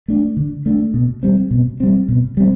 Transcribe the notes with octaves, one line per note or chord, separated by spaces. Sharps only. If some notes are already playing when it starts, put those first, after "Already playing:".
A3 D4
D3
A3 D4
B2
G3 C4
B2
G3 C4
B2
G3 C4